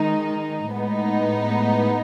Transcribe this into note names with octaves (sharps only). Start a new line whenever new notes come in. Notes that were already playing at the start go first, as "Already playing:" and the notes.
Already playing: D#3 G#3 D#4
A2 G#3 B3 D#4